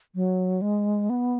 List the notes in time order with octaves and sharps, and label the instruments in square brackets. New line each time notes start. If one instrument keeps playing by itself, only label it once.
[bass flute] F#3
G#3
B3